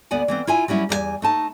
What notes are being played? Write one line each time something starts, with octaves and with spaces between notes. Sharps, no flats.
D2 B3 D5 F#5 G#5
E3 B3 C4
E4 F4 E5 G#5
F#3 G3 C#4 E4
E2 G3 A#4 G#5
A3 D#4 A5